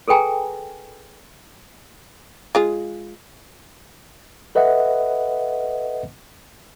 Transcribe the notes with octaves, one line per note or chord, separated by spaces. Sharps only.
G#4 A4 B4 G5 G#5 A#5
G#3 F4 G#4
A4 B4 D#5 E5 F#5